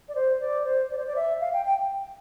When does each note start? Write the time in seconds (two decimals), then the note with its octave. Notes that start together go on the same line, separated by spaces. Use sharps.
0.09 D5
0.15 C5
0.41 D5
0.65 C5
0.91 D5
0.98 C5
1.07 D5
1.16 E5
1.41 F5
1.53 G5
1.66 G5